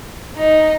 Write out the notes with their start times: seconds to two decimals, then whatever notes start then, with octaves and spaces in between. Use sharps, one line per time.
0.35 D#4